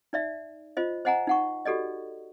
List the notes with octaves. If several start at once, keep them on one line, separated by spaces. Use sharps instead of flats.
D#4 D5 E5
F4 C5 D#5
C5 D#5 F#5 G#5 A#5
D#4 F#5 C#6
F#4 G4 A4 D5 D#5